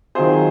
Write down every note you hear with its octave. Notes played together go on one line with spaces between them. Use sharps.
D#3 F#3 C4 F4 G#4 C5